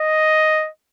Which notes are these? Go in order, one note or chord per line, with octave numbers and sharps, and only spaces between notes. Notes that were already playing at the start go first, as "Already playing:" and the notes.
Already playing: D#5